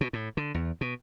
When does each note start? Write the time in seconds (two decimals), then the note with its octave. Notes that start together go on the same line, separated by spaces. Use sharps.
0.01 B2
0.13 A2
0.37 D3
0.54 E2
0.81 B2